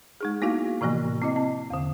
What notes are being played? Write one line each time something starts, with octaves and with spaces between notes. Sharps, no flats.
G#3 D#4 G#4
A#3 B3 D#4 E4 F#4 F5
A2 C3 E3 F3 A#3
C4 E4 D#5
C4 A5
E2 D3